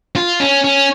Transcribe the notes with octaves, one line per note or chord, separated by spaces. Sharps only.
F4
C#4
C#4